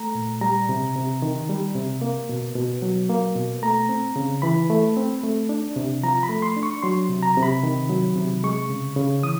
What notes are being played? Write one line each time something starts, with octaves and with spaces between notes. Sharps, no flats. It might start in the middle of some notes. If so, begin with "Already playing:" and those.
Already playing: A3 A#5
A#2
G3 A#5
C3
C3
D#3
G3
C3
A#3
B2
B2
F#3
A#3
B2
A3 A#5
C4
C#3
E3 B5
A3
C4
A3
D4
C3
F3 A#5
B5
A3
C6
D4
C#6
F#3 C6
C3
A#5
C3
B5
D#3
F#3
C3
G#3 C#6
C#3
C#3
E3 D#6